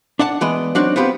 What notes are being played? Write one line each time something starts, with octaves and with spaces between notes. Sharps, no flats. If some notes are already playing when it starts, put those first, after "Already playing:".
D4 D5 F#5 A5
E3 G#3 B3 D5 D#5
F#3 C4 D4 D#4 F#4 D5
B3 C4 F4 G4